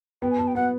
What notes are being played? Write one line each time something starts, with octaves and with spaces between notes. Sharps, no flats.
B3 G5
G#5
B3 A5
G5
B3 F#5